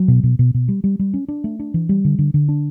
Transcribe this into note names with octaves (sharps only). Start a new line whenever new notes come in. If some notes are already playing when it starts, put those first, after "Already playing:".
Already playing: F#3
B2
B2
B2
B2
G3
G3
G3
C#4
D4
A3
D4
E3
G3
D3
D3
D3
D4